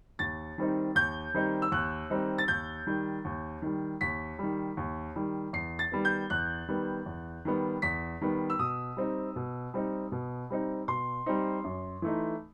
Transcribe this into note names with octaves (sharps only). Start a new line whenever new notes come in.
D#2 A6
D#3 G3 C4 D#4
D#2 G6
D#3 G3 C4 D#4
E6
D#2 F#6
D#3 G3 C4 D#4
A6
D#2 G6
D#3 G3
D#2
D#3 G3
D#2 B6
D#3 G3
D#2
D#3 G3
E2 C7
A6
D#3 G3 B3
G6
E2 F#6
D#3 G3 B3
E2
D#3 G3 B3
E2 B6
D#3 G3 B3
E6
B2 D#6
G3 C4 D#4
B2
G3 C4 D#4
B2
G3 C4 D#4
B2 C6
G3 C4 D#4
F#2
E3 A3 D#4